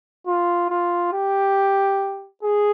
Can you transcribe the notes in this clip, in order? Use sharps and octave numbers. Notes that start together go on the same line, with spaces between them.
F4
F4
G4
G#4